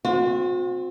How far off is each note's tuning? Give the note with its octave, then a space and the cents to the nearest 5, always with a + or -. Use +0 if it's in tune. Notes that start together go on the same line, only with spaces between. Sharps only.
C4 +0 F#4 -40